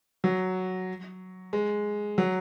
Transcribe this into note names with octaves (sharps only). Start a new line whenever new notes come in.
F#3
G#3
F#3